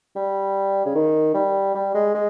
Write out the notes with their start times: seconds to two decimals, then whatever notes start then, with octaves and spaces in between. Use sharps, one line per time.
0.16 G3
0.85 C#3
0.95 D#3
1.34 G3
1.74 G3
1.94 G#3
2.14 G#3